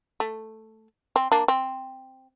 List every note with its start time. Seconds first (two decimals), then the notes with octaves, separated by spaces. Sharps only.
0.20 A3
1.16 C4
1.32 A#3 D4
1.48 C4